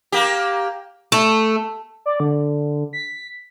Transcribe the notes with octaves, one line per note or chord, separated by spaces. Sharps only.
A#3 G4
A3
D5
D3
B6